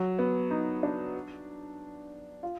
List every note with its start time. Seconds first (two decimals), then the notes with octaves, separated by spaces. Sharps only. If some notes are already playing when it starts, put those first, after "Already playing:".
Already playing: F#3
0.19 B3
0.50 D#4
0.83 D4
2.43 F4